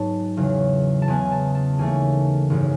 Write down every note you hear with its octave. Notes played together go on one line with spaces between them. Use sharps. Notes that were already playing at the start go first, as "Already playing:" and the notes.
Already playing: G#2 F#3 B3 A5
E2 C#3 F#3
A5
E2 C#3 G#3 B3 G#5
A5
A5
D#2 C#3 E3 A3 G#5
G#1 F#2 E3 G#3